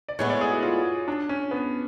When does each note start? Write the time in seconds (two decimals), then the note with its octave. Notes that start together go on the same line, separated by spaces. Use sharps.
0.08 D5
0.19 A2 G#3 B3 C#5
0.30 D5
0.41 G#4
0.52 F#4
0.63 F4
1.08 D4
1.29 C#4
1.51 B3